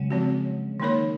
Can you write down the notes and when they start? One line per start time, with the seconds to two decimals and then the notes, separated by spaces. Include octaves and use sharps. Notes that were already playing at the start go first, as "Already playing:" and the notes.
Already playing: C#3 F#3 G#3
0.11 F3 C4 F#4
0.80 D#3 A#3 D#4 A#4 C#5